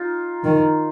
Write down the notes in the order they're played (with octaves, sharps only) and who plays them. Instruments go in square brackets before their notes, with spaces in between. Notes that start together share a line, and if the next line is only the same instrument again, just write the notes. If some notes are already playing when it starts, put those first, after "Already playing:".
Already playing: [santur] D#4 F4
[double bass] D#3